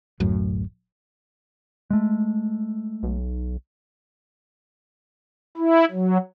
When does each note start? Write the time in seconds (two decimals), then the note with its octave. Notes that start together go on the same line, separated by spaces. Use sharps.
0.20 D1 F#2 A2
1.90 G#3 A3
3.03 B1
5.57 E4
5.91 F#3